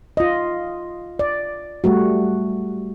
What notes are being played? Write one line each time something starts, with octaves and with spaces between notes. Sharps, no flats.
F4 D#5
D5
G3 A3 F#4